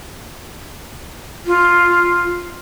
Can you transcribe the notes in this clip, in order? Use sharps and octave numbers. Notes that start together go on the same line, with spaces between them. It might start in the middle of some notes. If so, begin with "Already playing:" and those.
F4